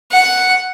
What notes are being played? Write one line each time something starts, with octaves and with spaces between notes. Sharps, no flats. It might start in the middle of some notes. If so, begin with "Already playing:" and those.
F#5